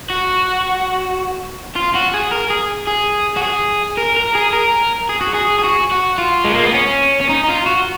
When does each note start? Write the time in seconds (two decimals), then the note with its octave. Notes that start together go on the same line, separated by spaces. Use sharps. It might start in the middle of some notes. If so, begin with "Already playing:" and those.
0.10 F#4
1.76 F4
1.95 F#4
2.14 G#4
2.31 A#4
2.50 G#4
2.87 G#4
3.37 F#4
3.43 G#4
3.97 A#4
4.16 A#4
4.35 G#4
4.53 A#4
5.09 G#4
5.21 F#4
5.34 G#4
5.59 G#4
5.64 F#4
5.91 F#4
6.19 F4
6.45 G#3
6.54 A#3
6.65 B3
6.74 C#4
7.21 C#4
7.30 D#4
7.44 D#4
7.49 F4
7.66 F#4